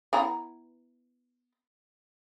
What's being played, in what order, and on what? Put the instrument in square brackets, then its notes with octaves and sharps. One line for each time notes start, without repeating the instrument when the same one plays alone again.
[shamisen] B3 E4 A#5